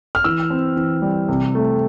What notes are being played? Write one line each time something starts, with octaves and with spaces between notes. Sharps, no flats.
F6
E3 E6
C4
E3
G3
C3
A3